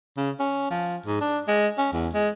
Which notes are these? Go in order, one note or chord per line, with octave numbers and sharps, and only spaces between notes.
C#3
C#4
F3
G#2
D4
G#3
C#4
E2
G#3